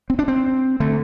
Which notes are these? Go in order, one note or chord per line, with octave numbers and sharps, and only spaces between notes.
C4
D4
C4
D3 A3